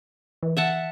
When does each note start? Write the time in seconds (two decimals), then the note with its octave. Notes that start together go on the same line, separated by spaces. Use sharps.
0.43 E3
0.57 E5 F#5 A5